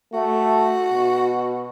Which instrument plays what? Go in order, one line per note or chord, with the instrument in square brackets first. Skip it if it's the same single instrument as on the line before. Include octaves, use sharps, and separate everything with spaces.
[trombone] A3 [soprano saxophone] F#4
[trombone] B2